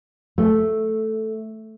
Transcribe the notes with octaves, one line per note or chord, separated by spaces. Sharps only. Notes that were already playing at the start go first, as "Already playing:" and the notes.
A3